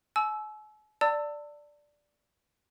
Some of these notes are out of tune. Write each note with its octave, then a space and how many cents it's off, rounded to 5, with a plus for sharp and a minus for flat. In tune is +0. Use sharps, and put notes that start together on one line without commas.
G#5 +45 E6 +0
D5 +0 A5 +35 E6 +0